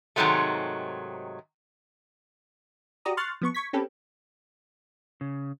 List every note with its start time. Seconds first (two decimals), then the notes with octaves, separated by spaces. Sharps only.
0.16 G#2 C3 D#3 F#3 G#3 A3
3.05 F#4 G4 D5 A#5 D#6
3.17 C6 C#6 F6 F#6 A6
3.41 F3 B3 C#6
3.54 C#6 G#6 B6
3.73 C4 C#4 G4 A4 B4
5.21 C#3